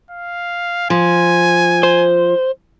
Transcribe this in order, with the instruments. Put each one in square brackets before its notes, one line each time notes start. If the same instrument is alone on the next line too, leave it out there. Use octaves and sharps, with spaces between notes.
[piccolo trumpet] F5
[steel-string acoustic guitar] F3 [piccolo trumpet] G#5
[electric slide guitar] C5